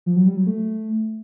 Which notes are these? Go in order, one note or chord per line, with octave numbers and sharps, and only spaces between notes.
F3
F#3
G3
F#3
A3